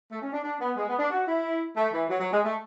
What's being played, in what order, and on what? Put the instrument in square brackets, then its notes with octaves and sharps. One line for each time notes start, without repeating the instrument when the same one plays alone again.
[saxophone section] A3
C#4
D4
D4
B3
G#3
B3
D4
F#4
E4
A3
E3
F#3
F#3
G#3
A3